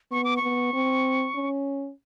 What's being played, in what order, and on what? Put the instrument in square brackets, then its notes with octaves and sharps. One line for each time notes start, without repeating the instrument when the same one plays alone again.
[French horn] B3 [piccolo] C#6
[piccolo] D6
C#6
[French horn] B3
C4
C#4